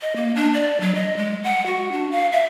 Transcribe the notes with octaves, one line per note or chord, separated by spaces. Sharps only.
D#5
A#3
D4
D5
F#3
D#5
G#3
F#5
F#4
D4
F5
E5